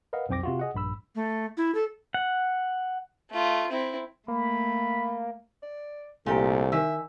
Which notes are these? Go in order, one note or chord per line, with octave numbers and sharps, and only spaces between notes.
A#4 B4 D#5 F5 F#5
B1 F2 C4 G5 D6 A#6
C3 F4 F#4
G#4 D#5 F#5
A#1 G2 B5 E6
A3
E4
A4
F#5
A3 F4
C4 E4
A3 A#3 B5
D5
C2 A#2 A3 G4 G#5 A#5
D#3 A#4 E5 G#5 E6